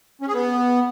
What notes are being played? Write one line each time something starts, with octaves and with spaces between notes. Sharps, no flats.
C#4
G#4
B3